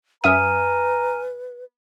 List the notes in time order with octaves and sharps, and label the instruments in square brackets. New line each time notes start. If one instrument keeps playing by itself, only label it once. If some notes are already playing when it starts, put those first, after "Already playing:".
[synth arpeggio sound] F#2 E5 D#6 [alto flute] B4 [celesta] G#5 F6 D#7 [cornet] A#5